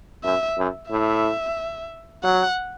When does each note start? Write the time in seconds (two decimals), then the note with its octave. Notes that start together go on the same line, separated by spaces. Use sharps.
0.24 F#2 E5
0.58 F#2
0.91 A2 E5
2.23 F#3 F#5